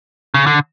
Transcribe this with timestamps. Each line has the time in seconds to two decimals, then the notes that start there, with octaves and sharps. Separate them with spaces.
0.34 C#3
0.46 D3